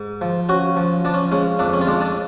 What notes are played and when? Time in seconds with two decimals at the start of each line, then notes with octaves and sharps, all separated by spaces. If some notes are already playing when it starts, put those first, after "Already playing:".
Already playing: G#2
0.21 F3
0.49 C#4 F#4
0.76 F3
1.05 F3 D4
1.14 C#4
1.32 G#3 C#4
1.59 F2 D4
1.73 C#4
1.81 F4
1.87 G#3 D4
2.01 D4